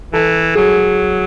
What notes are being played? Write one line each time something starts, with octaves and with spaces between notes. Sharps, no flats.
E3 A4
F#3 G#4